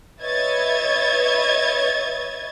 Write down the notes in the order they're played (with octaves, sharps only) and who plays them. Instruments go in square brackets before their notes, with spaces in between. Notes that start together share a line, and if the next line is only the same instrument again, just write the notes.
[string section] B4 C#5 D#5 E5 G#6 A6